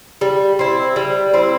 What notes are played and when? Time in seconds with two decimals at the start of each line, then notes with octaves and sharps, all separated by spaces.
0.21 G3
0.59 C4 E4
0.96 G3
1.33 C4 E4